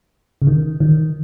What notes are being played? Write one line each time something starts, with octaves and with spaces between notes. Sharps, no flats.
C#3
D#3
D#3